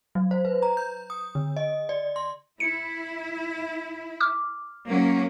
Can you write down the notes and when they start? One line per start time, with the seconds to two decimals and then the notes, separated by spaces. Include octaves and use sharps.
0.15 F#3
0.31 C5
0.45 B4
0.62 A#5
0.77 G6
1.10 D#6
1.35 D3
1.57 D#5
1.89 D5
2.16 C6
2.60 E4 C#7
4.20 D6 F6
4.87 F#3 A#3 C#4